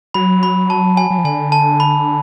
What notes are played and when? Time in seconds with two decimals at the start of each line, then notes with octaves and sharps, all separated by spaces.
0.14 F#3 B5
0.43 B5
0.70 A5
0.97 G#5
1.10 F#3
1.18 F3
1.25 D3 G#5
1.52 A5
1.80 B5